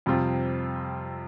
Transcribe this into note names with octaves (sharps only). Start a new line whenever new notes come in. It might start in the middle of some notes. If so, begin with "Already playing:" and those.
F2 C3 G3 C4 F4